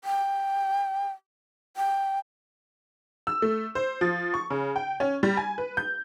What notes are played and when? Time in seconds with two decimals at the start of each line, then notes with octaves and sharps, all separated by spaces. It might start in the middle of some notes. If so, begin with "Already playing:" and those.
0.04 G5
1.77 G5
3.27 E6
3.42 A3
3.75 C5
4.01 F3
4.34 C#6
4.50 C#3
4.76 G5
5.00 C#4
5.23 G3
5.37 G#5
5.58 B4
5.77 G6